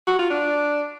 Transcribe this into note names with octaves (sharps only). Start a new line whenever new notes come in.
F#4
F4
D4